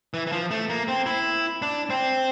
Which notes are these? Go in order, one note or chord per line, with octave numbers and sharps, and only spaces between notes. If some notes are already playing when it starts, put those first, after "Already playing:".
E3
E3
F3
A3
A#3
C4
E4
D4
C4